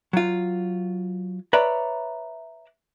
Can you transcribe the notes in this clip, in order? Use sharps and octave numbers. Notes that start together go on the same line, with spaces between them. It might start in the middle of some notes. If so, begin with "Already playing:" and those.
F#3 F4
B4 C#5 D5 E5 A#5 B5